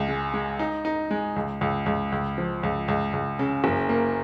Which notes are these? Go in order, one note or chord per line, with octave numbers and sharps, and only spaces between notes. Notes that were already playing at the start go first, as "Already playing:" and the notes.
Already playing: C#2
G#3
G#3
D#4
D#4
G#3
C#2
C#2
C#2
C#2
F3
C#2
C#2
C#2
C#3
F#1
A#3